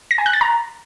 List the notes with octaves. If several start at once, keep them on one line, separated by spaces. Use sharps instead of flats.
A#6
G#5
F#6
A6
A#5